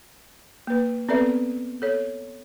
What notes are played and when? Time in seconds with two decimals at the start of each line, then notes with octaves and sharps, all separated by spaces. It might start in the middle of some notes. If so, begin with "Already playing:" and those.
0.67 A#3 B4
1.09 B3 C4 A4 B4 D5 E5
1.82 A4 C#5